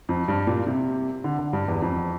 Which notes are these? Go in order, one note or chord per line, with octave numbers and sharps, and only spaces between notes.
F2
G2
A#2
C3
D3
D3
G2
E2
F2